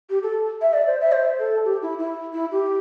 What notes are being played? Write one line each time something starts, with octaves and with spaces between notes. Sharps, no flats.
G4
A4
E5
D5
C5
E5
C5
A4
G4
E4
E4
E4
G4